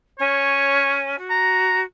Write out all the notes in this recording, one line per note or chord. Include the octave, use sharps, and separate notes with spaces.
C#4 C#5
F#4
A#5